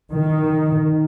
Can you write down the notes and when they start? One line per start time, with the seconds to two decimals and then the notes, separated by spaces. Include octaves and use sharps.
0.13 D#3